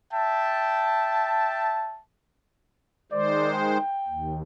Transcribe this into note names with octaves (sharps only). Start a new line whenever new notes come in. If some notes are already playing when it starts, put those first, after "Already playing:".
E5 G5 A5
D#3 G#3 C5 D5
G5
D#2